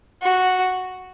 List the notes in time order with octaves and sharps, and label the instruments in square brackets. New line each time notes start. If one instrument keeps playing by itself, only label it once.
[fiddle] F#4